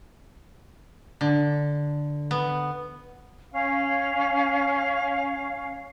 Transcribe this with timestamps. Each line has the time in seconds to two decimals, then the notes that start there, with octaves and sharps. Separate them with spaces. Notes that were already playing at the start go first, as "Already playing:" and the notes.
1.21 D3
2.31 B3
3.52 C#4 F5